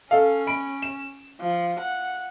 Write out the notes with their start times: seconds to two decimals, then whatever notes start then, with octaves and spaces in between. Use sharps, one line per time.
0.11 C#4 A4 F5
0.47 B5 D7
0.82 E7
1.41 F3
1.79 F#5